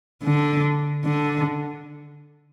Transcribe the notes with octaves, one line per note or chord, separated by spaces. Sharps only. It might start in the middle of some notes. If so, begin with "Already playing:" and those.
D3
D3